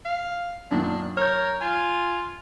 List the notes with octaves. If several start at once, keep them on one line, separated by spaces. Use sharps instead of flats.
F5
F#2 A#2 D#3 D4
A#4 C#5 F6 G6
F4 G#5